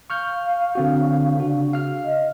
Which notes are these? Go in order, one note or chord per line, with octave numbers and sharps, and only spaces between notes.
F5 C#6 F6 G6
D3 C4 F#4
C#3 D4 F#4
F5 F6
D#5